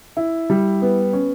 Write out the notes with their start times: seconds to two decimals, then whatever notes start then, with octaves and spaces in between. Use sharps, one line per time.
0.17 E4
0.50 G3
0.82 B3
1.13 C#4